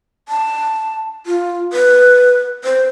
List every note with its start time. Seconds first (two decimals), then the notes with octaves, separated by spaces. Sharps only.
0.29 A5
1.26 F4
1.73 B4
2.64 C5